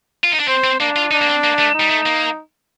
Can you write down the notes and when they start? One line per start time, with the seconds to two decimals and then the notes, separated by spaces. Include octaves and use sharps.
0.24 F4
0.32 D#4
0.40 D4
0.48 C4 C5
0.64 C4
0.80 A#3 D4
0.96 F4
1.11 D4 D#4
1.21 A#3
1.27 C4
1.44 A#3
1.59 A3
1.75 D#4
1.80 G3
1.90 A3
2.06 A#3